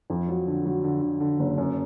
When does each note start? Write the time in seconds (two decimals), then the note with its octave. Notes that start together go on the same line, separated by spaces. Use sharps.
0.10 F2
0.28 F#3
0.47 D3
0.65 F#3
0.84 D3
1.02 D3
1.20 D3
1.39 F#1
1.58 F#2